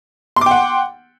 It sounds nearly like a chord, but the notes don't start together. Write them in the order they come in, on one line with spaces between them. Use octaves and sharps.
C6 D6 G5 F#5